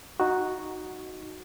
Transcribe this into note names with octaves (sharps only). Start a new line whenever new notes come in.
D#4 F#4